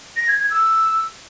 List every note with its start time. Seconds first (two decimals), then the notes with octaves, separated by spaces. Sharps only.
0.17 A#6
0.28 G#6
0.39 G#6
0.51 E6